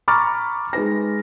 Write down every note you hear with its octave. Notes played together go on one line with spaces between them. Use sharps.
A#5 B5 C#6 D6 F6 A6
G#3 D#4 B4 A#6